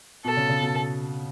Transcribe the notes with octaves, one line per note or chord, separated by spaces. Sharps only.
B2 A4
C#3
C#3
B2